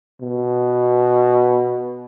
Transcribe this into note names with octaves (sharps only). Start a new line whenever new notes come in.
B2